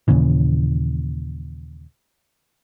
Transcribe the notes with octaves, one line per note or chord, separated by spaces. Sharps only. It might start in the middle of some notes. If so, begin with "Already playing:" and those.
D#2 A#2 C#3 E3